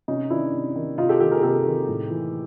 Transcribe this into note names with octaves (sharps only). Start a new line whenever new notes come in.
C3 C#4 D#4
D#3 D4 E4
C3
D#3
C3 D#4 F4
G4 A4
D#3 G4 A4
G#4 A#4
C3 G4 A4
D#3
A2
E3